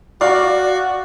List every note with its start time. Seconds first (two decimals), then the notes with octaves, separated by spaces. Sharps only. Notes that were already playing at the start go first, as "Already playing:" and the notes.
0.21 F#4 D5 F5 C#6